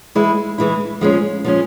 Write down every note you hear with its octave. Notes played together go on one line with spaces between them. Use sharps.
E3 G#3 E4
E3 G#3 E4
F3 G#3 C#4
F3 G#3 C#4